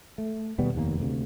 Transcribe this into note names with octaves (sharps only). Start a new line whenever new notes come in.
A3
D#2 B2 G3 B3
F1 D#2 C3 A#3
D2 C3